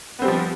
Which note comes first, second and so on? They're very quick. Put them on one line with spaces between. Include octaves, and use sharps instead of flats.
B3 C4 G3 F3